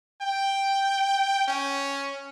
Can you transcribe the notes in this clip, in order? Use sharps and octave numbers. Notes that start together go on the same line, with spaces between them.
G5
C#4